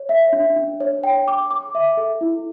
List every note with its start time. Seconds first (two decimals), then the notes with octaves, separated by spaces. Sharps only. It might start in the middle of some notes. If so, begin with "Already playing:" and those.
Already playing: C#5
0.09 E5
0.33 D4
0.56 D4
0.80 C#5
1.04 G5
1.28 D6
1.51 D6
1.75 E5
1.97 A4
2.21 E4